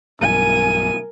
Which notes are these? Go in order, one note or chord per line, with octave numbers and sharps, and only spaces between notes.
B1 G2 B2 A#4 G#5 D#7